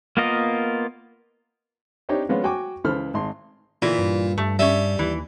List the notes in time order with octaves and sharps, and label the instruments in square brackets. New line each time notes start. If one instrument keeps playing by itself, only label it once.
[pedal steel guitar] A#3 B3 F4 A#4 D#5
[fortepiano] C4 D4 D#4 G4 C#5
F3 G#3 B3 C#4 F4
F#4 G5 G#5 C#6 D6
C#2 E3 A4 C5 B5 F6
G#1 C6
[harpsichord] A#2 [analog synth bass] D3 [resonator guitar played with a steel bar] E3
[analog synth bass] G2
[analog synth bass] G2 [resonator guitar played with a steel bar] A3
[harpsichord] G3 [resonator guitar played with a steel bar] C#4 E5
[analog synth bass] D#2 [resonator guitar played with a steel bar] E3